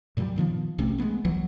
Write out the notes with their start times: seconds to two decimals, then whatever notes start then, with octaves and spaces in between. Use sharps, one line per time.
0.17 G2 A#2 F#3 G3
0.36 A#2 D#3 F3 B3
0.78 B1 C3 A3 C#4
0.98 G#3 A3 B3 C#4
1.24 C2 E3 F#3 A#3